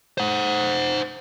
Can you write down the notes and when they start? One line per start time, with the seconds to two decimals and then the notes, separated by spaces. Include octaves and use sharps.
0.18 C5 F#5